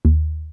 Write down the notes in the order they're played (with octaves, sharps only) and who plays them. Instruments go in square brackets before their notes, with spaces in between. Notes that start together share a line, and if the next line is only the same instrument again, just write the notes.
[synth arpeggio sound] D#2